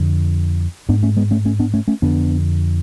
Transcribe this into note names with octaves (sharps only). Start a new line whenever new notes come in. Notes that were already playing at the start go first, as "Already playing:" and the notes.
Already playing: F2 D3
G#2 B3 D4
A3 C#4
G#3 B3
A3 C#4
A3 C#4
B3 D4
A3 C#4
A3 C#4
F2 D3 B3 D4